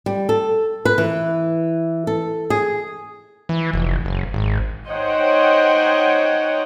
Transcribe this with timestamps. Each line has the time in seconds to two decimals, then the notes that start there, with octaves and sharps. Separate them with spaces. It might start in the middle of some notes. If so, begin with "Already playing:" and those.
0.06 G3
0.29 A4
0.85 B4
0.98 E3
2.07 A4
2.50 G#4
3.49 E3
3.74 F1
4.05 F#1
4.34 G#1
4.89 D#4 C5 C#5 D#5 F#5 G5